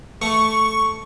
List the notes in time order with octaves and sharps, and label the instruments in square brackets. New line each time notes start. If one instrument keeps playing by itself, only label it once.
[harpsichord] A3 [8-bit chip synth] C#6